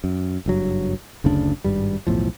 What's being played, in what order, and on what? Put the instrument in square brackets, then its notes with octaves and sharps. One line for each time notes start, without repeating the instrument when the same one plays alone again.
[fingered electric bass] F#2
F#1 G2 F#3
F#1 D2 C#3 D4
G#1 G2 G3
B1 E2 A2 F3